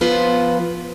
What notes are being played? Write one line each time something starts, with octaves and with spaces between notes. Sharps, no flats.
F3 B3 F4 B4 C5